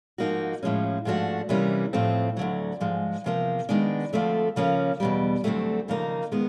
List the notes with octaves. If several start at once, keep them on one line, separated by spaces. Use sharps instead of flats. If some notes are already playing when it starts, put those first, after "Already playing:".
G#2 F3 A#3 D#4 F#4
A2 F3 G#3 C#4
G#2 F3 A3 D4 F#4
C3 E3 G3 A#3 C#4
A2 F3 A3 C4
D2 D3 F#3
G#2 F3 G#3
E2 C3 F3 A#3
D#3 G#3 B3 D4
D2 D3 F3 A3 C4
C#3 F3 A#3 C#4
E2 B2 G3
D2 D3 F#3 A3 C4
D#2 C#3 F3 A#3 D#4
D#3 G#3 B3